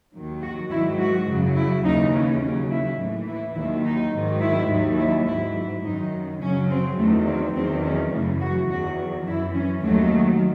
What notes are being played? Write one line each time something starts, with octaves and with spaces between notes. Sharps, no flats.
D#2 D#3 F#3
F#4
G#2 D#3 F#3 E4
F#4
F#2 C#3 F#3
E4
D#2 C#3 E3 D#4
C#4
D#2 C#3 F#3 C#4
E4
A2 E3
E4
D#2 D#3 F#3 E4
D#4
G#2 D#3 F#3
E4
D#2 D#3 F#3
E4
G#2 F#3 E4
E4
F#2 D#3 F#3 D#4
F#2 C#3 F#3 C#4
C4
E2 D#3 F#3 A3
C4
E2 D#3 F#3 C4
C#4
F#2 C#3 E3 A3
F#4
E2 D#3 F#3 F#4
F#2 E3 E4
C#4
D#2 D#3 F#3 A3